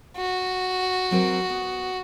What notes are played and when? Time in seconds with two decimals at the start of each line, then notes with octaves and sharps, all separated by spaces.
0.17 F#4
1.11 F#3 C4 A#4
1.49 B3